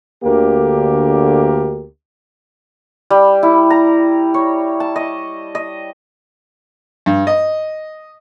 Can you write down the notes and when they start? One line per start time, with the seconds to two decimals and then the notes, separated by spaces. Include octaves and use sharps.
0.23 D2 D3 A#3 G4 A#4
3.10 G3
3.43 E4
3.70 A#5
4.34 C#5
4.80 A5
4.96 D#5
5.55 D#5
7.06 G2
7.27 D#5